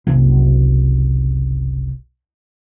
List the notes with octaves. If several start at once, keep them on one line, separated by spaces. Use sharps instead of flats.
F#1 C2